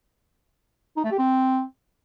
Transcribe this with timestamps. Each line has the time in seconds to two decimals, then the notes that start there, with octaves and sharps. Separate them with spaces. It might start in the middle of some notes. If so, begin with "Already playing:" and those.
0.97 D#4
1.04 A3
1.11 G4
1.19 C4